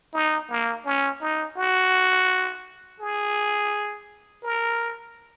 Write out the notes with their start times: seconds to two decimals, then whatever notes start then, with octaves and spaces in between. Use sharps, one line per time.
0.14 D#4
0.50 A#3
0.85 C#4
1.21 D#4
1.57 F#4
3.00 G#4
4.43 A#4